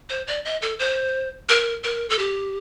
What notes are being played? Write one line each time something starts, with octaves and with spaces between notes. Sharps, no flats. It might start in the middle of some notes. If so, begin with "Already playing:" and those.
C5
D5
D#5
A4
C5
A#4
A#4
A4
G4